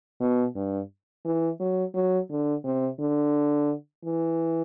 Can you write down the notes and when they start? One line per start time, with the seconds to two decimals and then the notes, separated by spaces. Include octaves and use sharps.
0.20 B2
0.55 G2
1.25 E3
1.60 F#3
1.94 F#3
2.30 D3
2.64 C3
2.99 D3
4.04 E3